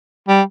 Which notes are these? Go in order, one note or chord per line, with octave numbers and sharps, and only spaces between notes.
G3